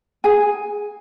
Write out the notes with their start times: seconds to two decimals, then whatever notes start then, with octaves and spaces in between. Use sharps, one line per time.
0.24 G#4 G#5